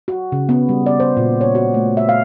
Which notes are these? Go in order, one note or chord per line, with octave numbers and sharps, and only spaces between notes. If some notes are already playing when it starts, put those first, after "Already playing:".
F#4
C#3
B3
G3
D5
C5
A#2
C#5
F#4
A3
E5
F5